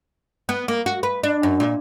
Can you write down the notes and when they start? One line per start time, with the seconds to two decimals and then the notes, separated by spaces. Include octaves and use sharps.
0.49 B3
0.68 A#3
0.86 F#4
1.03 B4
1.23 D4
1.43 F#2
1.60 A#2